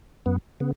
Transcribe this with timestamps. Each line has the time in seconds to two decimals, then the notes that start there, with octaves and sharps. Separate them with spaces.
0.26 F#2 B3
0.60 C#3 B3